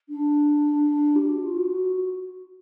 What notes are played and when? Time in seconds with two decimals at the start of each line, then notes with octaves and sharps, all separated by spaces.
0.09 D4
1.16 G4
1.29 F#4
1.43 F4
1.57 F#4